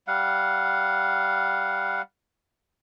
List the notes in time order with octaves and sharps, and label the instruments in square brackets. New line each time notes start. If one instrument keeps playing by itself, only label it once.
[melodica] G3 F5 F#5